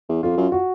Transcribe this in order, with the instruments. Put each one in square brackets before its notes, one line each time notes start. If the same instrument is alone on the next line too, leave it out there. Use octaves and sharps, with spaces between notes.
[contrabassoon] E2
[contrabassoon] F2 [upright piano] F4
[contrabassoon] F#2
[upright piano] F#4